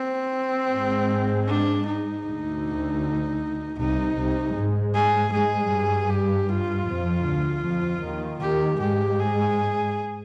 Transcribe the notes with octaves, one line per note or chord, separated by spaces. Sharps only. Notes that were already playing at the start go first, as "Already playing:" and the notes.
Already playing: C4
G#2 G#3
D4
D#4
D2 D3
C2 C3 D#4
C2 C3
G#2 G#3
G#4
G#2 G#3 G#4
G2 G3
G4
F4
F2 F3
D2 D3
F2 F3
D#2 D#3
D#2 D#3 G4
G#2 G#3 G4
G#4